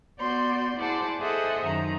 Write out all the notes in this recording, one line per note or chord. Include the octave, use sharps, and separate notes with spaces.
B3 F#4 D5 C6 G6
E4 G#4 C5 D5 F#5 A5
G#4 A4 C5 D#5 E5 F#5
F#2 D#3 A#5